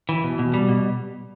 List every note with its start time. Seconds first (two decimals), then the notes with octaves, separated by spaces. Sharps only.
0.09 E3
0.24 B2
0.39 B2
0.54 G3
0.69 B2